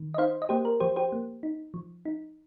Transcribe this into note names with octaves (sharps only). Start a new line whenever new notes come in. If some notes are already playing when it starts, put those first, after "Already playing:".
Already playing: D#3
D#5
D#4 C5 F5
D#5
A#3 G4 C5
A#4
F3 G4 C5
G4 C5
A#3
D#4
F3
D#4